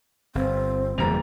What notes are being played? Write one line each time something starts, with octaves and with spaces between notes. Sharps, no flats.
G1 C4
F#1 E2 B2 G3 A#5 F7